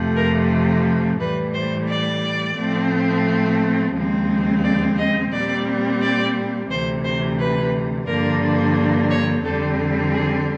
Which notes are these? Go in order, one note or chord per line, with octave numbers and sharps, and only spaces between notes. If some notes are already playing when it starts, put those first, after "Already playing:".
Already playing: F2 C3 F3 A3
A#4
A2 E3 G3 B4
C5
D5
A2 F3 A3 C4
D#2 C#3 F3 G#3 C4
D5
D#5
A#2 G3 C4 D5
D5
D2 C3 E3 C5
C5
B4
G2 D3 F3 A#3 D4 A#4
C#5
F2 D3 G3 C4 A4
G#4